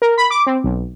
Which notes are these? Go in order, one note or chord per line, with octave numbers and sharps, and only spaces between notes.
A#4
B5
D6
C4
B1